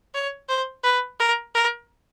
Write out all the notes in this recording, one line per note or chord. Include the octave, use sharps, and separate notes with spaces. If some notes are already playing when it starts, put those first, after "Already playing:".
C#5
C5
B4
A#4
A#4